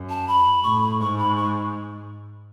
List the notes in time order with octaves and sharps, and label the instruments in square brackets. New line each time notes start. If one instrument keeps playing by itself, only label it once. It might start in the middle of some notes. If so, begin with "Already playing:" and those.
Already playing: [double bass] F#2
[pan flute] A5
B5
[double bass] A2 [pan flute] C#6
[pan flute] B5
[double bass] G#2 [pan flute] C#6
[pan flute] B5
C#6